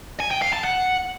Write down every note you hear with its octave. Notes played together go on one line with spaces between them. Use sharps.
G#5
G5
F5
A5
F#5